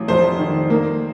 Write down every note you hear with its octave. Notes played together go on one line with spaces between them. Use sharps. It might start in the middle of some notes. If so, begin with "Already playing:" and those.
Already playing: A1 F#3
F1 C5
D#3
A#3